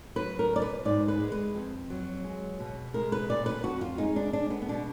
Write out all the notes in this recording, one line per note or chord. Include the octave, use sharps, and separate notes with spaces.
F#3 B4
A#4
B2 D5
B4
G#2 D5
B4
G#3
B4
F2
F#3
G#3
B2
G#3 A#4
B4
A#2 D5
B4
F2 F#4
F4
G#3 D#4
D4
G#3 D4
B3
B3
B2 D4